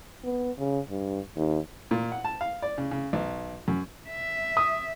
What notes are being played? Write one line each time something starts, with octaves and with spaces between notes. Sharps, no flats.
B3
C#3
G2
D#2
A#2
F#5
A5
F5
D5
C#3
C#3
B1
F#2
E5
D#6